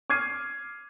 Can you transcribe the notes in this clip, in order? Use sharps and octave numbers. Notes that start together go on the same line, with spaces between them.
D6 F6 G#6 C7 D#7